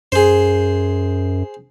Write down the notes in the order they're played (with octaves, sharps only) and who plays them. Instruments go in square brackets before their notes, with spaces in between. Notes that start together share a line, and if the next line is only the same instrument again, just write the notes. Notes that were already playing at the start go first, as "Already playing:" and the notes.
[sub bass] F#2 [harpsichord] G#4 C5